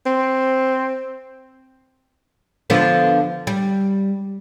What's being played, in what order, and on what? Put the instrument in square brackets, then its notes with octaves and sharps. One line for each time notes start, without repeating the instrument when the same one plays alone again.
[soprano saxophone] C4
[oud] D3 F3 B3
G3